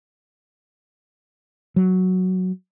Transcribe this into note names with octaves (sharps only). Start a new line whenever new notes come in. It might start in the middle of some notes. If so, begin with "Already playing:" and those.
F#3